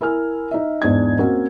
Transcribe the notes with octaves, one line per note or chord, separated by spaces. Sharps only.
E4 A#4 G#5 F6
D#4 E5
E2 G#2 D4 G#6
A#3 C4 C#4 F#4 A#4